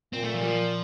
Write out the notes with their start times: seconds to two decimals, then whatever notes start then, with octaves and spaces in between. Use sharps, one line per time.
0.13 A#2 C4
0.23 A3
0.34 F3
0.41 G3
0.46 F3